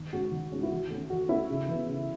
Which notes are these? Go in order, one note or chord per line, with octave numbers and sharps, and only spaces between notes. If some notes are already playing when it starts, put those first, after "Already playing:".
Already playing: D#3
G#3 C#4 F#4
D#3
G#3 C#4
E4
E3 F#4
A3 C#4
E3 F#4
A3 C#4 E4
C#3
E3 B3
C#3